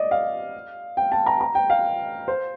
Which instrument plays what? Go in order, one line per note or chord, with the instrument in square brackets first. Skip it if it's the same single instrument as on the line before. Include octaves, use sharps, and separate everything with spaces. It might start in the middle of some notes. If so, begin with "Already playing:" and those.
Already playing: [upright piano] D5 D#5
F5
G5
A5
A#5
A#5
G5
F5
C5